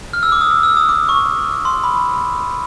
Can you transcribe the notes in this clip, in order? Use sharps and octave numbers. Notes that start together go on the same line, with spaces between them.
F6
E6
D6
D#6
E6
E6
D#6
D6
C#6
C6
B5